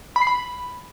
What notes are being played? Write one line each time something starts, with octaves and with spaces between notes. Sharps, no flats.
B5
C7
B5